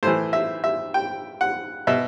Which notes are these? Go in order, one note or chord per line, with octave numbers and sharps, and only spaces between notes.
A2 E3 C5
E5
E5
G5
F#5
B2 E5